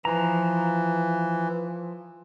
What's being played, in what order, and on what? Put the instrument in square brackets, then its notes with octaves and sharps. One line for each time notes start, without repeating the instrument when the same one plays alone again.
[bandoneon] E3 [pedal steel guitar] F3 A#5